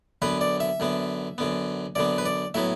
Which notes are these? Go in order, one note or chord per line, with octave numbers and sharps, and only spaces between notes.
F#2 D3 B3 B4
D5
E5
F#2 D3 B3
F#2 D3 B3
F#2 D3 B3 D5
B4
D5
A2 F#3 B3 E5